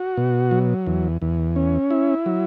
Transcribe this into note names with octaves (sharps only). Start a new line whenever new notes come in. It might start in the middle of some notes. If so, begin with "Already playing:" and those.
Already playing: F#4
B2
F#3
E2
E2
C#4
E4
F#3